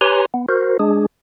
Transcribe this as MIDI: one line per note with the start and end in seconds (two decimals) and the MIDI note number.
0.01 0.26 67
0.01 0.26 71
0.01 0.26 73
0.01 0.26 80
0.01 0.26 82
0.01 0.26 84
0.34 0.46 59
0.49 0.78 66
0.49 0.78 70
0.49 0.78 72
0.79 1.06 56
0.79 1.06 62
0.79 1.06 68